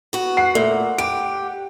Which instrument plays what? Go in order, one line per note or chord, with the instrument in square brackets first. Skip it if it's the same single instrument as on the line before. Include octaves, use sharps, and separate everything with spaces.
[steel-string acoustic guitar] B3 F#4
[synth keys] F#5 [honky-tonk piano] C7
[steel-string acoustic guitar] A#2 [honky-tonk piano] A3
[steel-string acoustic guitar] G4 [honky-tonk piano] D7